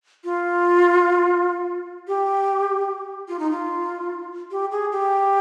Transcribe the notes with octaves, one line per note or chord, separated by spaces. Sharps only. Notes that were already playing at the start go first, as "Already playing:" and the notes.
F4
G4
F4
D#4
F4
G4
G#4
G4